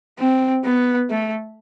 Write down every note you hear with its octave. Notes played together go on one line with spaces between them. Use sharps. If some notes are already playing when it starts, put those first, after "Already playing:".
C4
B3
A3